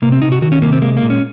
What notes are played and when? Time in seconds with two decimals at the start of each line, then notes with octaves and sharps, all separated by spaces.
0.02 C3 A#3
0.12 C4
0.22 C3 D#4
0.32 F#4
0.42 D#3 F#4
0.52 C#4
0.62 C3 A#3
0.72 C4
0.82 G#3 A#3
0.97 A#3
1.02 A#2
1.10 C#4